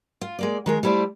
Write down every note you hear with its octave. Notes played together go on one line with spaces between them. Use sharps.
F4
G#3 A#3 D5
D#3 G#3 A#4
G3 A3 E4 C5 D5